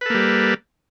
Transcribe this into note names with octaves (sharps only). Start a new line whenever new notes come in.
G3 A#3 A4 B4